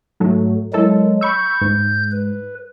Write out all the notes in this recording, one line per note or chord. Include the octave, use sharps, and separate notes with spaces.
G#2 F#3 A3
F#3 G#3 E4 A4 A#4
B5 C#6 E6 G6
G#2
B4